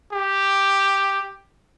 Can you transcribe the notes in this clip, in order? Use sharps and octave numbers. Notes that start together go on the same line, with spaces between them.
G4